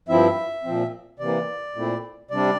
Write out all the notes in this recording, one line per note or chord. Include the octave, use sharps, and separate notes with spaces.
G2 F3 C4 E4 E5
A#2 F3 C4
C3 E3 A#3 D5
A#2 A3 C4 E4
C3 G3 D4 D5